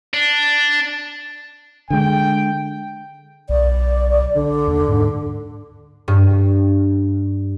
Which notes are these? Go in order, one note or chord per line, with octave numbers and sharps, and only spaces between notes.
D4
D3 G#3 G5
B1 D5
D3
D#2
G#2
G2